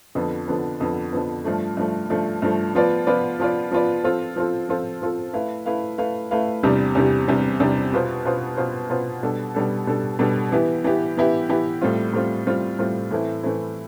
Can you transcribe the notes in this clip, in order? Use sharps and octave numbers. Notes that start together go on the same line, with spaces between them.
F2 D3 F3 B3
F2 D3 F3 B3
F2 D3 F3 B3
F2 D3 F3 B3
G2 F3 A3
G2 F3 A3
G2 F3 A3
G2 F3 A3
F3 B3 F4 B4 D5
F3 B3 F4 B4 D5
F3 B3 F4 B4 D5
F3 B3 F4 B4 D5
F3 C4 F4 A4
F3 C4 F4 A4
F3 C4 F4 A4
F3 C4 F4 A4
A3 E4 B4 F5
A3 E4 B4 F5
A3 E4 B4 F5
A3 E4 B4 F5
E2 C3 G3 D4 G4
E2 C3 G3 D4 G4
E2 C3 G3 D4 G4
E2 C3 G3 D4 G4
B2 B3 F4 C5
B2 B3 F4 C5
B2 B3 F4 C5
B2 B3 F4 C5
B2 G3 D4 A4
B2 G3 D4 A4
B2 G3 D4 A4
B2 G3 D4 A4
E3 B3 E4 G4
E3 B3 E4 G4
E3 B3 E4 G4
E3 B3 E4 G4
A2 G3 C4 F4
A2 G3 C4 F4
A2 G3 C4 F4
A2 G3 C4 F4
A2 E3 A3 C4 E4
A2 E3 A3 C4 E4